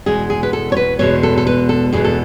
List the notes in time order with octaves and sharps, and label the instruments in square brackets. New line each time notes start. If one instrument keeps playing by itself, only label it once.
[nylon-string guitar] E2 B2 G#3 G#4
G#4
B4
A4
C#5
B4
E2 B2 G#3 C#5
A4
A4
B4
A4
E2 B2 G#3 G#4
A4